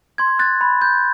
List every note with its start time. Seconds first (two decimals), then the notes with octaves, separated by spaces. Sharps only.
0.18 C6 G#6
0.39 F#6 A6
0.61 B5
0.82 G6